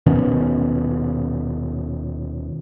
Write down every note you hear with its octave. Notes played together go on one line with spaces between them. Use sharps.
D#1 B2 D#3 C#4